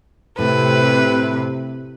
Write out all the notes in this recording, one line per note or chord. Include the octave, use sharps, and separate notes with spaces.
A2 C3 B4